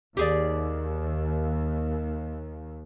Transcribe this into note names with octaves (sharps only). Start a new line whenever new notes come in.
D#2 G4 G#4 D5